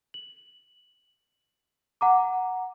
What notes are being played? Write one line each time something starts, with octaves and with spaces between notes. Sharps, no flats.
F#7
F#5 A#5 D6